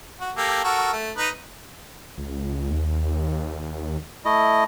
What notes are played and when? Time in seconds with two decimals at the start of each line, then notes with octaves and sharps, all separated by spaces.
0.21 F#4
0.37 A#3 G4 A4
0.64 F#4 A4 A#4
0.93 A3
1.17 D#4 B4
2.18 C#2
2.71 D#2
4.25 A3 E4 D#5